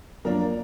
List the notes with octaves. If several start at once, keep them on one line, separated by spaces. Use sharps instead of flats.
F#2 F3 A#3 D4 A#4 A#5